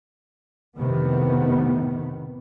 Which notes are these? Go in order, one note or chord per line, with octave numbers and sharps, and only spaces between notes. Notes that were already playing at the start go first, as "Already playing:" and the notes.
F2 A2 C3 D#3 B3